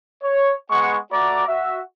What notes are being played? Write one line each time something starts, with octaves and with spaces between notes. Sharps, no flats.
C#5
G#3 B3 F#5 C#6
A3 F#4 D5 A#5 D6
F#4 E5